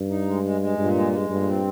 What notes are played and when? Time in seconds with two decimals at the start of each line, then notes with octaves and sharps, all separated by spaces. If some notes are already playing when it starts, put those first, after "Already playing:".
Already playing: G2
0.10 D#4
0.27 G#3
0.44 G#3
0.61 G#3
0.78 G2 A#2
0.95 G#3
1.12 G#3
1.29 G2 A#2
1.47 C4